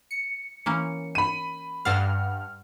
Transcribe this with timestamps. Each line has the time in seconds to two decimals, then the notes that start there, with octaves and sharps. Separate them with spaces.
0.11 C#7
0.66 E3 A#3 C#4
1.15 B5 D#7
1.85 G2 A4 F5 F#5 F6